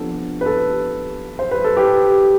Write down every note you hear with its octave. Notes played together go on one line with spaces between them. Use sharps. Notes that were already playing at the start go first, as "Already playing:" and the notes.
Already playing: C3 F3 B3 D4 A4
B4
A4
C5
B4
A4
G4 B4